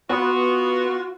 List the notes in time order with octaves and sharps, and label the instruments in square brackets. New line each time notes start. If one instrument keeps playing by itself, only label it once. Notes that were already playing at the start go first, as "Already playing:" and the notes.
[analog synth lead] B3 [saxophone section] F4 F#4